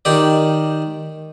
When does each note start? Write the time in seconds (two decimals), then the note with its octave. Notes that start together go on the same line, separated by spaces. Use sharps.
0.05 D#3 G4 D5